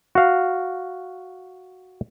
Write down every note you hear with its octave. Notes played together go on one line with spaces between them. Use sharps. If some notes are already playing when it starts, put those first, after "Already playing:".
F#4 F5